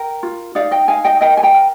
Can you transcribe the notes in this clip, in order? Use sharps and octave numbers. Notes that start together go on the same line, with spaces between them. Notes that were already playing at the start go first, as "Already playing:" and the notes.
Already playing: A#4 G5
F4
D#4 D5 F5
D#5 G5
D#4 F5 G#5
D#5 G5
A#4 D#5 G5
G#5
G5 A#5
A#4